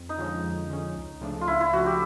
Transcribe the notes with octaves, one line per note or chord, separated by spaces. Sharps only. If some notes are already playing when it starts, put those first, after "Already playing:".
Already playing: F2
D#4
D3 F3 G#3 C#4
F2
D3 F3 G#3 C#4
C#2
C#3 F3 A3 D4
F4
C#2 E4
E4
C#3 F3 A3 D4 F#4
G4